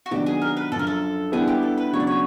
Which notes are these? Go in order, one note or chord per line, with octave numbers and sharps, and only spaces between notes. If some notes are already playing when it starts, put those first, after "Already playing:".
F#4
C3 D#3 F#3 B3 D4 G4
G#4
A#4
B4
F#2 D3 F3 A4
A#4
A4
D3 G3 B3 E4 G#4
G4
A4
B4
C#3 F#3 B3 D4 C#5
D5
C#5